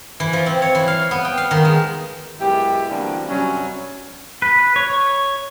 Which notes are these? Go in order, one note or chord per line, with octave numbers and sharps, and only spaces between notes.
E3
F3
C4
C#5
E3
F5
B3
G5
F5
D#3
G#3
F#2 G#3 B3 E4 G4
B2 D3 E3 G3 A#3 C4
G2 C3 F#3 G3 C#4
B4
C#5